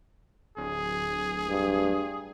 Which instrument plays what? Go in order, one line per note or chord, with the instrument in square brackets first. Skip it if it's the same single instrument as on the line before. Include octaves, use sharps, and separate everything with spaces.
[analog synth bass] D1 [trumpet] G#4
[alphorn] G2